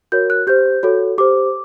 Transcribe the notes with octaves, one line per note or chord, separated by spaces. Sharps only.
F#4 A#4 C#5 G6
F#6
G4 C5 G6
F#4 A4 C#5
G4 C5 D6